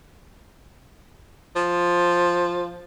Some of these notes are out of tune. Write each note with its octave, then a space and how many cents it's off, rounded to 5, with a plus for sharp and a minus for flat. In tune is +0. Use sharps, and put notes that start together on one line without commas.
F3 +5